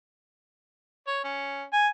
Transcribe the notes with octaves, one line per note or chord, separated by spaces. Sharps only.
C#5
C#4
G#5